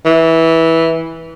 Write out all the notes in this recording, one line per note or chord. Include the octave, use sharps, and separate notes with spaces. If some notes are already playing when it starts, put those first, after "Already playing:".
E3